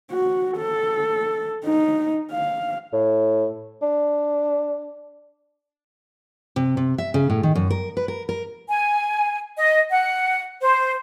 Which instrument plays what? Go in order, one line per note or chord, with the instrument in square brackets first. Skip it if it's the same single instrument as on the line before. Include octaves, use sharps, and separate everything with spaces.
[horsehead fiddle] F#4
A4
D#4
F5
[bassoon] A2
D4
[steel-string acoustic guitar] C3
C3
E5
C#3
A2
D#3
F#2
A#4
B4
A#4
A#4
[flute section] G#5
D#5
F#5
C5